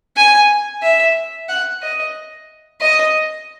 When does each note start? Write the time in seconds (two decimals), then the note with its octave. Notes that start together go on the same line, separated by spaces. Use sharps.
0.17 G#5
0.82 E5
1.49 F#5
1.82 D#5
2.81 D#5